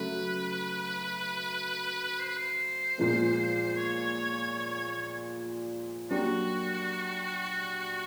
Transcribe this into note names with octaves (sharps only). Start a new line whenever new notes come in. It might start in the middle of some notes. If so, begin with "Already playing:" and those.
Already playing: C#3 F#3 A3 B4
C5
B4
C5
A#2 F3 G#3 B3
C#5
F#3 A#3 D4 F#4 G4